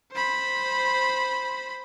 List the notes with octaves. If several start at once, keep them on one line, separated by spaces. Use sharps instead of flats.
C5 B5